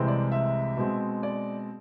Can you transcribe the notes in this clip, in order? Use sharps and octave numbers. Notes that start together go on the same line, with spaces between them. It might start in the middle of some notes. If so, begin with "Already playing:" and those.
Already playing: C2 C3 E3 G#3 C4
D5
E5
B2 G#3 C4
D5